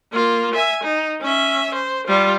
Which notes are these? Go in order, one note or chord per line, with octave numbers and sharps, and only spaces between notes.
A#3 F4
E5 G#5
D#4
C#4 E5
C5
G3 F4